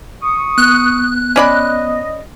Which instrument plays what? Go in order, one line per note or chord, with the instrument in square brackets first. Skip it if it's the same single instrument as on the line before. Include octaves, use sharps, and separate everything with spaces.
[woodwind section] C#6 D#6
[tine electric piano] B3 [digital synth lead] F#6
[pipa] C#4 D5 B5 [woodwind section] D#5